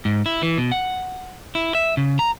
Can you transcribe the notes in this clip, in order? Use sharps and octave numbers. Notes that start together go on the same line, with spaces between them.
G#2
E4
E3
B2
F#5
E4
E5
C#3
A#5